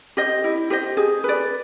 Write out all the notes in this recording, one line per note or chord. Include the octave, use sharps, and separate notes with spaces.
G4 C5 D#5
E4
G4 C5 D#5
G#4
B4 D5